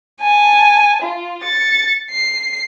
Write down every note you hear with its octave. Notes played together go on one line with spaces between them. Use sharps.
G#5 A5
F4
A6 C#7
C7